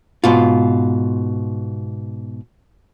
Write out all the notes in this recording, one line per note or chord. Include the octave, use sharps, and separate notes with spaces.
G#2 B2 F4